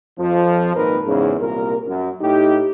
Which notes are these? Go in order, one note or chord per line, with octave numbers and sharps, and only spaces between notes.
F2 F3
G#1 A#2 D#3 A#4 B4
E2 G#2 C#3
C2 A#2 A#4
F#2
A2 D#4 G4